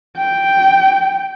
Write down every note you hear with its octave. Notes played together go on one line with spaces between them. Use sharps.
G5